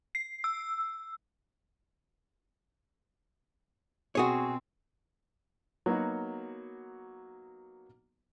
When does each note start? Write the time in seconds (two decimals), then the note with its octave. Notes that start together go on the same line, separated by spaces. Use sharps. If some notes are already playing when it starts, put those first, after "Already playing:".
0.15 C7
0.44 E6
4.15 B2 C4 F#4 G#4 C#5
5.86 F#3 A#3 B3 D#4 F#4